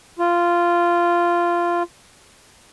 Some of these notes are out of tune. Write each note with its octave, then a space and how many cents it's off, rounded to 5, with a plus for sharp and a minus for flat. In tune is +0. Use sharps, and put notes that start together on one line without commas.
F4 -10